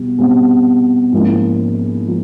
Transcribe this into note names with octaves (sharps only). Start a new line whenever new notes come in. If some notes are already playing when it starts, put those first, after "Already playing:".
Already playing: B2 G3
B2 G3 C4
G#2 F3 A#3 C#4 E4
F3